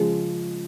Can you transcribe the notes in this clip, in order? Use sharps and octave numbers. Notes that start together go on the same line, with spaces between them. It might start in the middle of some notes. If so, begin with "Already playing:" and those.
Already playing: C#3 F3 G#3